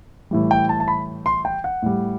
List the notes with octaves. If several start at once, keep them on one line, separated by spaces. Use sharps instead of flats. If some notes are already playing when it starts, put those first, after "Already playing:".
A2 E3 G3
G5
A5
A5
B5
C6
G5
F#5
A2 G3